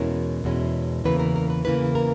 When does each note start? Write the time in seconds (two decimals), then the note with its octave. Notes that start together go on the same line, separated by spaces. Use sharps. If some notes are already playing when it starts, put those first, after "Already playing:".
Already playing: E2 B2 G#3 C#4 E4 A#4
0.44 E2 B2 G#3 C#4 E4
1.04 E2 C#3 E3 A#3 B4
1.19 A#4
1.36 A#4
1.50 B4
1.65 E2 C#3 E3 A#3 B4
1.95 A#4